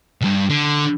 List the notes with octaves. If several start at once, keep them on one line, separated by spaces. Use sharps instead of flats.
C2 G2
D3